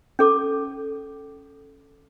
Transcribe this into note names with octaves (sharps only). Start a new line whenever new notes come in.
C#4 A4 D6